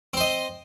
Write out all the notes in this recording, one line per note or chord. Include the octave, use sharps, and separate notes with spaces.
C4 C5 D#5